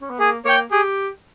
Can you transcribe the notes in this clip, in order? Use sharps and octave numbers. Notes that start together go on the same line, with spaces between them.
C#4
B3
A#3 G#4
A#3 C#5 G5
G4 G#4